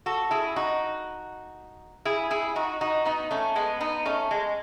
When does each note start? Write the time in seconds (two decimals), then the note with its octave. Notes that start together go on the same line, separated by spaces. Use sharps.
0.06 F#4 A4
0.31 E4 G#4
0.56 D#4 F#4
2.05 E4 G#4
2.31 E4 G#4
2.56 D#4 F#4
2.81 D#4 F#4
3.05 B3 D#4
3.31 A3 C#4
3.56 G#3 B3
3.80 B3 D#4
4.06 A3 C#4
4.31 G#3